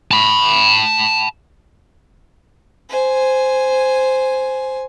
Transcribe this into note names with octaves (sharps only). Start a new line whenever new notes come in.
A5 B5
C5 G#5